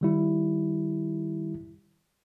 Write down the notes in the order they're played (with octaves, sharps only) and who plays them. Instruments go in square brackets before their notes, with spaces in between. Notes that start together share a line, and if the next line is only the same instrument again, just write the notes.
[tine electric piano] D#3 G3 E4